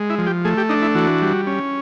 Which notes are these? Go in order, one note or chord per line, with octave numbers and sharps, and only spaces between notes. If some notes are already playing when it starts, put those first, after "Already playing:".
Already playing: G#3
E4
F3
G4
A3 G#4
G4
D4 D#4
E4
E3 F#4
G3
C#4